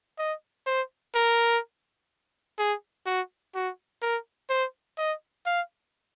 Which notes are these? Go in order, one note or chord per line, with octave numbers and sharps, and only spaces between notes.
D#5
C5
A#4
G#4
F#4
F#4
A#4
C5
D#5
F5